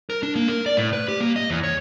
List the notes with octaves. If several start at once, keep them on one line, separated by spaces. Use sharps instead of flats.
A#4
D4
A#3
A#4
D5
A2
B4
G4
A#3
D#5
E2
C#5